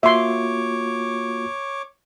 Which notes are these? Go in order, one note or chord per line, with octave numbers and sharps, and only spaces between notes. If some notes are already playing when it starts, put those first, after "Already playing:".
A#3 F4 F#4 C#5 E5 C6 D6